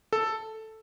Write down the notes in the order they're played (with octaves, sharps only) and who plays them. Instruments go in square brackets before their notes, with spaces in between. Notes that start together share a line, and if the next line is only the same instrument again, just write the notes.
[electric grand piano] A4